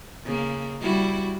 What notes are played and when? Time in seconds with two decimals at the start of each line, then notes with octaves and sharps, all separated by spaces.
0.24 C#3 A#3
0.80 G3 E4 F#4